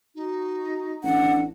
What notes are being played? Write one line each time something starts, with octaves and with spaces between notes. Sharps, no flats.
D#4 F#4
A1 D4 F#5